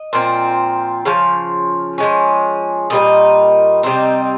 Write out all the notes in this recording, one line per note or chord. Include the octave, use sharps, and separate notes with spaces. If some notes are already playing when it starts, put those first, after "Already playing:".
Already playing: D#5
A#2 F3 C4
C#3 F3 F5
F3 G#3 C#4
A#2 G3 A#3 D#4 D#5
C3 G3 C4 D#4